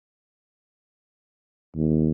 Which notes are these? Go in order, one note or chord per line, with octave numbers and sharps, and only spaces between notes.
D#2